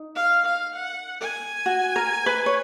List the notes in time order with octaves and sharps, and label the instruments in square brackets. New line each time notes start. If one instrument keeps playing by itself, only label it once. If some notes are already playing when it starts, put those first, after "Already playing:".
Already playing: [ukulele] D#4
[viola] F5
F5
F#5
G#5
[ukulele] F#4
A#4
B4
C#5